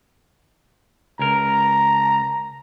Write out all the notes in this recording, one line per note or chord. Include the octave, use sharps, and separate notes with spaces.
C#2 A#4 A#5